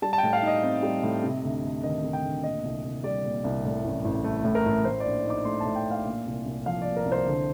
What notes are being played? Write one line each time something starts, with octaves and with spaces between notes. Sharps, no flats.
G3 A5
A5
A2 G5
F5
D#4 D#5
C4
G3
A2
C3
D2
A3
D#3 D#5
C3
G5
D2
A#2 D#5
C2
C2
G3 D5
A#2
C2
A2
A1
A1
A3
A2
A#4
A1
A2 C5
D5
A#1
D#4 D6
A3 C6
A5
A2
G5
A#1
F5
A#2
C2
C2
F3 F5
A#2 D5
A#4
C2
C5
D3